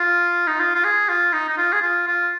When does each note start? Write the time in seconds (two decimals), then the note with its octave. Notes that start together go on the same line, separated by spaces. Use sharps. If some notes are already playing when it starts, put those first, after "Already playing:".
Already playing: F4
0.47 D#4
0.59 F4
0.75 F4
0.84 G#4
1.09 F4
1.33 D#4
1.49 D#4
1.58 F4
1.73 G#4
1.82 F4
2.07 F4